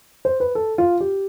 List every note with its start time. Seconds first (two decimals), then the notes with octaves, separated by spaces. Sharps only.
0.25 C5
0.40 B4
0.55 A4
0.78 F4
1.00 G4